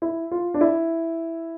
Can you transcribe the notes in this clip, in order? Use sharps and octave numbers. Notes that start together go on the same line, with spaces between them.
E4
F4
D4
E4